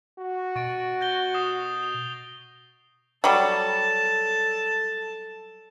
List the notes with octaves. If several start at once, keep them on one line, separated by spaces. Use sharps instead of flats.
F#4
B2 C#6 A6 D7
G6 A#6 G7
D#6 C7 E7
F7
F#3 G3 A4 A5